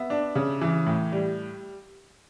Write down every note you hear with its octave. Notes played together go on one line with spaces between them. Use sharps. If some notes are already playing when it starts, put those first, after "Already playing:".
Already playing: B3 E5
D4
C#3
E3
A2
G3